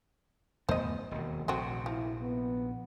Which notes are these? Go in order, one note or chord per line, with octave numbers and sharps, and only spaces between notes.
E2 A3 B3 C5 D#5
E1 D#2
A#1 C3 A3 C4 F#4
F3 E4
B3